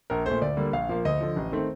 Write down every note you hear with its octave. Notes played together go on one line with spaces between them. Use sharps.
A#1 A#4
A#2 A3 C5
D2 D5
D3 G3 A#3
A#1 F5
A#2 F3 A#3
D2 D#5
D3 F3
A1
D#3 A3 C4